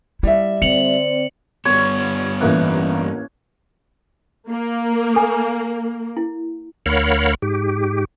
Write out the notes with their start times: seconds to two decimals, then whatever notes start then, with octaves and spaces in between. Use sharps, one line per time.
0.23 G3 E4 E5
0.62 D3 C4 D5 C#7 F7 F#7
1.65 G2 B3 C#5
2.41 A1 E3 A#3 D#4 F#6
4.50 A#3
5.15 A4 G#5
6.17 E4
6.86 D2 A#4 C#5 F5 F#5 B5
7.42 G#2 G4